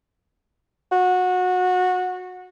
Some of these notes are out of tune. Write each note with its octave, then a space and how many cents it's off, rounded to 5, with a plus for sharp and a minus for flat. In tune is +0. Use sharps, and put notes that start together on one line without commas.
F#4 -20